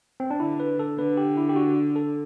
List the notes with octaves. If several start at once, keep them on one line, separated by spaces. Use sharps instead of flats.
C4
D4
D3 E4
B4
A4
D3 B4
G4
E4
G4
F#4
A4